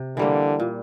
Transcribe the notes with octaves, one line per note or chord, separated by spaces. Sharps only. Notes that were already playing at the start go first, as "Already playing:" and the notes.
Already playing: C3
D3 E3 G3 A#3
A#2